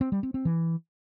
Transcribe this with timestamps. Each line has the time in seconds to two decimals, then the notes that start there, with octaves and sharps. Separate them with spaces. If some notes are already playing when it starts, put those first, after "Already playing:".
0.01 C4
0.12 G3
0.23 C4
0.34 C4
0.45 E3